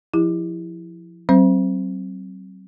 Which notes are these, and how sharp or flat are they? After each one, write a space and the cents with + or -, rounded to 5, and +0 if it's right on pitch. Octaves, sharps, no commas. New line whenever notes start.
F3 +0 E4 +0 G4 +35
F#3 +40 C4 +20 C5 -15